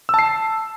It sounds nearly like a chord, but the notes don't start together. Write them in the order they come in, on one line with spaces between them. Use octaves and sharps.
E6 A5 C7